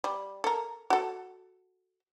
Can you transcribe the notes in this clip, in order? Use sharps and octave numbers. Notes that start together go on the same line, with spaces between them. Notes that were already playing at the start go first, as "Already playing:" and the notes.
G3
A4 A#4
F#4 A4